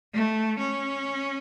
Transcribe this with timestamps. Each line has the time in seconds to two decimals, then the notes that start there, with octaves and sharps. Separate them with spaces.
0.14 A3
0.59 C#4